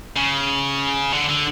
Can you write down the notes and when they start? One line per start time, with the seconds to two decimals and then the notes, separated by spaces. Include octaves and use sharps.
0.17 C#3
1.13 D3
1.29 D3